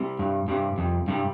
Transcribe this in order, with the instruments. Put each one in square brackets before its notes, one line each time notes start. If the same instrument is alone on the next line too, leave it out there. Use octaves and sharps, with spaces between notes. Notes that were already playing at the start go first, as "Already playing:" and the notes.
Already playing: [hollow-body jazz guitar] C2 C3 G3
[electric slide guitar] G2
[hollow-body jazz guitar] C2 C3 G3 [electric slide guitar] G2
[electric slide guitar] F2
[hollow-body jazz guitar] C2 C3 G3 [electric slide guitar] G2